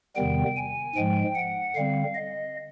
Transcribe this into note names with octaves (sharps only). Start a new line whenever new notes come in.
E2 C3 D#3 G3 B3 G5
G#5
G#2 F3 G#3 G5
F#5
D3 G3 C4 F5
D#5